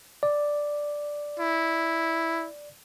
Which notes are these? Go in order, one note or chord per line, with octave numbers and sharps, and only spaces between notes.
D5
E4